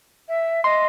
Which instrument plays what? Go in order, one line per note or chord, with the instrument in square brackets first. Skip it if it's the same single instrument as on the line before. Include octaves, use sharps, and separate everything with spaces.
[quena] E5
[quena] D#5 [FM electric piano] C6